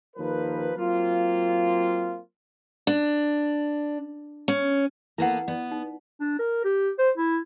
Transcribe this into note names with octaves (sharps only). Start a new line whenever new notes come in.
D#2 F3 A#4 B4
F#3 A#3 C4 F4
D4
C#4
A#3 B3 E4 A4 F#5
B3 D5
D#4
D4
A#4
G4
C5
E4